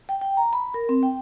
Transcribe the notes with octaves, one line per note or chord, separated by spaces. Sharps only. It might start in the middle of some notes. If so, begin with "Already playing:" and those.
G5
G5
A#5
B5
A#4
C4
G5